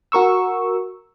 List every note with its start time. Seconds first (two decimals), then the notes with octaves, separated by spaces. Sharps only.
0.12 F#4 A#4 C#6 E6